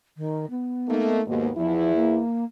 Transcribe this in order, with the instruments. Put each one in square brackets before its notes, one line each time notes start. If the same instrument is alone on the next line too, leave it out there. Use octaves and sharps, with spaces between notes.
[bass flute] D#3
B3
[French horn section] A3 A#3 D#4
[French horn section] D#2 G#2 B2 [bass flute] A#3
[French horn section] E2 E4 [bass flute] F3
[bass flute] A#3